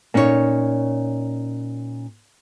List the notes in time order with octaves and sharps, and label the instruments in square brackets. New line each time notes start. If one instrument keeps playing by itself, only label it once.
[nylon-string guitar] A#2 C#4 D#4 F#4 C#5